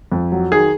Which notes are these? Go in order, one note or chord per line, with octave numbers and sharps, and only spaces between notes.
F2
F#3
D#3 G#4